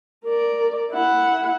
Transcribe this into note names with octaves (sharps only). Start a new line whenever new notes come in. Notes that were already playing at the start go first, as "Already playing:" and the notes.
A#4 D5
E4 F#5